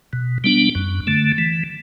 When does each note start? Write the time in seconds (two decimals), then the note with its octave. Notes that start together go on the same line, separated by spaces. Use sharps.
0.13 B2
0.44 G3 B3 D4
0.75 F#2
1.07 D3 A3
1.38 E3